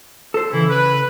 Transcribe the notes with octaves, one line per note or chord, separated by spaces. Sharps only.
A4 C5
C#3 E3 E4
B4